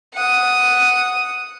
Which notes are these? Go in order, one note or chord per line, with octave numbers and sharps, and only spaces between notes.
F#5 D#6